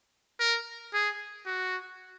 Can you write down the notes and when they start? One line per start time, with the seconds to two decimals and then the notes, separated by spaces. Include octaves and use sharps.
0.40 A#4
0.93 G#4
1.46 F#4